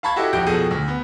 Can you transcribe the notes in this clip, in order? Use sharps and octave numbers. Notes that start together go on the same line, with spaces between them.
F5 A5 B5 C#6 G#6
E4 F#4 G4 A4 D#5 E5
E1 A#1 F#4 G4 G6 D7
F2 B2 G#4 A4 D#7
D2
B3